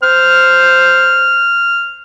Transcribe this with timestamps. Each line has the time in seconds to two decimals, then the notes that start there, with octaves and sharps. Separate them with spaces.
0.03 C5 F6